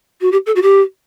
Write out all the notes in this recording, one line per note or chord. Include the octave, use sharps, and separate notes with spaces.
F#4
G4
A4
F#4
G4